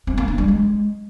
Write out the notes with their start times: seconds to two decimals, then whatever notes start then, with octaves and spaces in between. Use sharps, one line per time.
0.07 C4
0.18 A#3
0.28 D4
0.38 G3
0.48 G#3